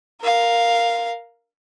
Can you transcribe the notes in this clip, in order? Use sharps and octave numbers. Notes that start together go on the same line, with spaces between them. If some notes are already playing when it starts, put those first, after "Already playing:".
A#4 F5